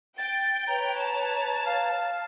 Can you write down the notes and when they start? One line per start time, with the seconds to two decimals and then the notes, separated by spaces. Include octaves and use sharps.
0.18 G5 A6
0.67 B4 C#5 A#5
0.99 A5
1.66 F5